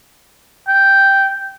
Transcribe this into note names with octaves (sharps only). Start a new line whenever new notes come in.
G5